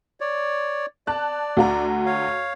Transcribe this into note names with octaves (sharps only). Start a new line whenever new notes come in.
C#5 D5
D5 A5 F#6
D2 F#4 A#5
C#5 F5